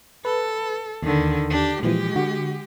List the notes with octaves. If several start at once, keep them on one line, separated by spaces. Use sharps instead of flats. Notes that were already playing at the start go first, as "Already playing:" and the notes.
A4 B4
D#2 D3 D#3
D4 G4
A#2 E3 F3 G#3 G4
D3 F#4